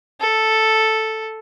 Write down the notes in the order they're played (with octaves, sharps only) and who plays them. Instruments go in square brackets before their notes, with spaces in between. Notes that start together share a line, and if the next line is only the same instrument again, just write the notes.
[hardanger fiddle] A4